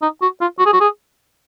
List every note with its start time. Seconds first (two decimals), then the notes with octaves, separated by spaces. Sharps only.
0.02 D#4
0.22 F#4
0.41 F4
0.59 F#4
0.66 G#4
0.73 F#4
0.81 G#4